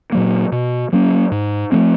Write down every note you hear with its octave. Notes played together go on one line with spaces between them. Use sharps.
A#2 F#3 A#3
B2
F#3 A#3 C#4
G#2
F3 A3 C4